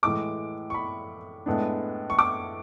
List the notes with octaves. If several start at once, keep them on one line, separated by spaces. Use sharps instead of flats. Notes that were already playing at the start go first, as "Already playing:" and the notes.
A2 E3 G#3 D6
C#6
B5
A2 G#3 B3 D4
C#6
D6